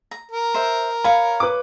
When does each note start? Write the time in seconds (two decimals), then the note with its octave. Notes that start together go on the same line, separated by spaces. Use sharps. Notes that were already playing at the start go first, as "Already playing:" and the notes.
0.11 A#5
0.32 A#4
0.54 C5 E5
1.04 C#5 F5 G#5 B5
1.40 B4 D6